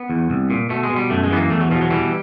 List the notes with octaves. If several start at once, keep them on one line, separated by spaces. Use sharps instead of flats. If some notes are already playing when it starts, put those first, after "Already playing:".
Already playing: B3
E2
C2
A#2
B2 A3
G#3
B2
G3
F#2 A3
G#3
E3 B3
A#3
E2 A3
F#3
B2 F3
F#3
E3 G3